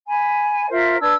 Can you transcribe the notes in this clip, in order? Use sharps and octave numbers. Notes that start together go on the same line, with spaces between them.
G#5 B5
F4 A#4 C5 E5
D4 B4 E6 G#6